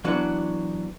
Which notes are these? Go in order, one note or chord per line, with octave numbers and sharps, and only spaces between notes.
E3 F#3 B3 D4 F#4